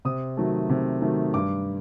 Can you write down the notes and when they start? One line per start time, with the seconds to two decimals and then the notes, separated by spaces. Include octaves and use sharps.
0.05 C3 D#6
0.37 D#3 F#3 A3
0.70 C3
1.02 D#3 F#3 A3
1.34 G2 D6